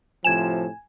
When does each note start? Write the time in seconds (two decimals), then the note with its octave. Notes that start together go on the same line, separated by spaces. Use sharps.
0.24 A2 C3 F3 G#5 G#6 E7